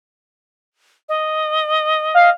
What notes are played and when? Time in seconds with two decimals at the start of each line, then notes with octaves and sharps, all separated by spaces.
1.09 D#5
2.14 F5